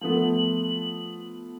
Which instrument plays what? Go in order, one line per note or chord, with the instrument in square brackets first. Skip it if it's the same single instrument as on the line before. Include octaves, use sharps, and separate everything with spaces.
[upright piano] F3 A3 B3 [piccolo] F#7